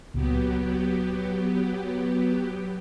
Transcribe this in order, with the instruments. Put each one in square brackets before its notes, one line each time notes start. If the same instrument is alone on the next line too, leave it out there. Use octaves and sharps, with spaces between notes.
[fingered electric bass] C#2 A#2 [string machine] F#3 B3 G4